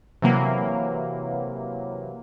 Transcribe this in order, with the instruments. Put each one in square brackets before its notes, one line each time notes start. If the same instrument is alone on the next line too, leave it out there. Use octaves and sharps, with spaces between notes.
[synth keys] C3 E3 F#3 A#3